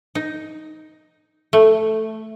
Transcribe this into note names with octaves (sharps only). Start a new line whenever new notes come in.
D#4
A3